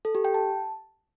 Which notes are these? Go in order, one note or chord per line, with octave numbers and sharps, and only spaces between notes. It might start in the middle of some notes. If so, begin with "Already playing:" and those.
A4
G4
G5
A5